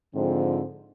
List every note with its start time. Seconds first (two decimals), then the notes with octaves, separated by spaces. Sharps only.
0.15 G#2 D3 F3 C4